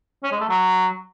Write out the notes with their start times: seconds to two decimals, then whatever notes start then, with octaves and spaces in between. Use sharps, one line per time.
0.23 C#4
0.32 G#3
0.40 A3
0.49 F#3